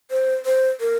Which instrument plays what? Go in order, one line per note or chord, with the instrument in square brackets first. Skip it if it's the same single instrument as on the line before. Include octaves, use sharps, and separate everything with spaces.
[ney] C5
C5
A#4